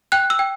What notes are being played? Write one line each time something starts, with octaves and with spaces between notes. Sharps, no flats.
G5 F#6
E6
G5